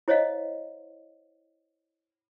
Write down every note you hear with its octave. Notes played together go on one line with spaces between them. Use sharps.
E4 C5 C#5 D#5 F5